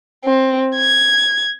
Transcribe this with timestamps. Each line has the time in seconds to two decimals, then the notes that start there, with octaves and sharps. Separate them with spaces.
0.25 C4
0.75 G#6